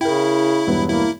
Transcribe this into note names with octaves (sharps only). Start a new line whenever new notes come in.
C#3 E4 A#4 G5
E1 G2 B3
A#3 E4